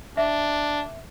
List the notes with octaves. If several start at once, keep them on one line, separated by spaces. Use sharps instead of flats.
D4 E5